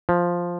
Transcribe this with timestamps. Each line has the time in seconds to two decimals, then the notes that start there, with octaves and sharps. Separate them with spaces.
0.09 F3